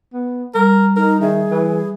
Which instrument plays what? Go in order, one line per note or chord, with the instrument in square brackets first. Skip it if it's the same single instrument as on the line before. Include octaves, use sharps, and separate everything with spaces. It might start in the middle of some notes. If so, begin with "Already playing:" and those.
[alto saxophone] B3
[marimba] G3 [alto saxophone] A#4
[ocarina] D#4 [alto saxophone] A#4
[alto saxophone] D#3 [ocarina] G#4 [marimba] E5
[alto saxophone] E3